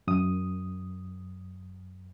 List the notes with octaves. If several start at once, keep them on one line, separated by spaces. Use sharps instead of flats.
F#2 D#6